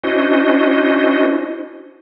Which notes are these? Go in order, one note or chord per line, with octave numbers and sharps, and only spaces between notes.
C#4 D4 E4 F#4 C5 D#5